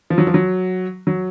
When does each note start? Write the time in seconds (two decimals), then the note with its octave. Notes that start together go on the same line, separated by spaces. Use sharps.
0.10 F3
0.18 F#3
0.27 F3
0.34 F#3
1.07 F#3